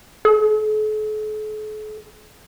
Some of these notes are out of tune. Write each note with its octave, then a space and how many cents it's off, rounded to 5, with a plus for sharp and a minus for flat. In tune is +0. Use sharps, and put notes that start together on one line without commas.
A4 -45